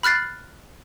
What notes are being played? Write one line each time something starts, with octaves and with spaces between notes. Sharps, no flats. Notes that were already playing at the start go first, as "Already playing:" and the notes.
B5 F6 F#6 A6 C7